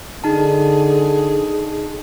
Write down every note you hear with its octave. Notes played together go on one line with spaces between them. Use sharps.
D3 D#4 G#4 A5